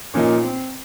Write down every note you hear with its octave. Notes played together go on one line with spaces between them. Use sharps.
A#2 F3 A#3 C#4 D#4
C4